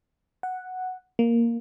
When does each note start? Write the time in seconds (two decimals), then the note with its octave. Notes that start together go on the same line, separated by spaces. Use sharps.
0.43 F#5
1.19 A#3